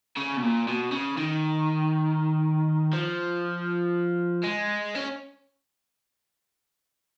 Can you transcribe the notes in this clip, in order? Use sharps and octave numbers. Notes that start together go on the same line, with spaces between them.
C#3
B2
A#2
B2
C#3
D#3
F3
G#3
C#4